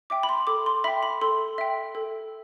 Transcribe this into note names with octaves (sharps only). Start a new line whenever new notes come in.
E5 G5 D6
B5
C6
A4 D6
C6
E5 G5 B5
B5
A4 C6
E5 G5
A4